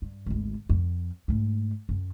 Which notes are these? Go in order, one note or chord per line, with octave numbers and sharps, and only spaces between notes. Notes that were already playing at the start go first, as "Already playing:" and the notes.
G2
G#1 D2
F2
G#2 A3
F#2